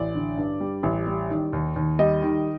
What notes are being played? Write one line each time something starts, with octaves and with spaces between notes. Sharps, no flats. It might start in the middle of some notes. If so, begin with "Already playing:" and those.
Already playing: A1 D5
D3
G2
G3
A1
G3
D#3
D#2
D#2
G3 D#5
D#3